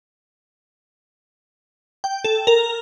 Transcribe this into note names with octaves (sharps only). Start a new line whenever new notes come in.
G5
A4
A#4